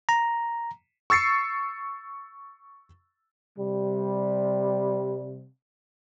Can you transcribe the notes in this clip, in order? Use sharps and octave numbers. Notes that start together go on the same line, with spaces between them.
A#5
C#6 E6 A6 C7 C#7
C3 G3